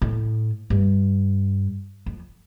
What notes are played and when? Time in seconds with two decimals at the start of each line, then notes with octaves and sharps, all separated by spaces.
0.02 A2
0.70 G2
2.06 F2